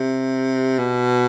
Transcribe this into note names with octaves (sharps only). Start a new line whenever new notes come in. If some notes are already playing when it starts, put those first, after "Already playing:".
Already playing: C3
B2